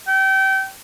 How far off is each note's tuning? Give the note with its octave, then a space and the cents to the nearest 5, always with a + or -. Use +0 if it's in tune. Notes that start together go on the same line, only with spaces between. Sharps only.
G5 -30